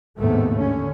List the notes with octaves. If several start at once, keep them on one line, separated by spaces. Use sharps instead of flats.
A1 D#2 G#2 C3 A3 B3
D3 C#4